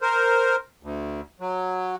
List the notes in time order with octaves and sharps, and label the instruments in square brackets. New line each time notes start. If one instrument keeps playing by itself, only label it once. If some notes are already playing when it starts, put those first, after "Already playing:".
[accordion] A#4 C5
D2
F#3